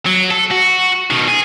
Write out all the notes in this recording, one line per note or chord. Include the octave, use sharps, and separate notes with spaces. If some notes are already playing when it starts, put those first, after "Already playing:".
F#3
A4
F#4
B2 D#3
G#4